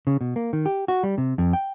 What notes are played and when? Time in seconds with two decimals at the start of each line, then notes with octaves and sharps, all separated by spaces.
0.07 C#3
0.21 B2
0.36 A#3
0.53 D#3
0.66 G4
0.88 F#4
1.03 G3
1.18 C3
1.38 F2
1.53 G5